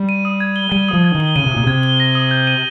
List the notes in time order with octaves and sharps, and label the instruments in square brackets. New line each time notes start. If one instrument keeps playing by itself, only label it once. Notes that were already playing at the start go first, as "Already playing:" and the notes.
Already playing: [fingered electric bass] G3
[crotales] D#7
D#6
G#6
G7
[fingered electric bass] G3 [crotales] D#7
[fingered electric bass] F3 [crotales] D#6
[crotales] G#6
[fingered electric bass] D#3
[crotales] G7
[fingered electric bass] C#3 [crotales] D#7
[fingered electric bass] C3
[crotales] D#6
[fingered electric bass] A#2
[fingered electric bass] C3 [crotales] G#6
[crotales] G7
A#6
D#6
G6
D#7